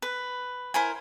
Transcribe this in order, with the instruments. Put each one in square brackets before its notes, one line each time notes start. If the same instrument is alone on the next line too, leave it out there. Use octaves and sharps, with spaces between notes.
[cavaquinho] B4
E4 A#4 C5 G#5